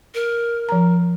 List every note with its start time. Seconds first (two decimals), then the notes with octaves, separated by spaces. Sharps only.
0.15 A#4
0.69 F3 A#5